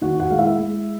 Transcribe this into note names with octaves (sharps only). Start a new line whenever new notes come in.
D#3 F#4 F#5
F#4 F#5
G#3 F5
E4 E5
G#3